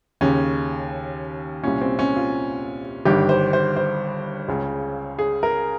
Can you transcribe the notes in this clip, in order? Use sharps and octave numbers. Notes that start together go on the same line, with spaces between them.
D#2 C#3 C#4
C2 A#2 C#4
C4
C#4
F4
G1 G2 D#3 G4
C5
C5
C5
C#2 C#3
G#4
A#4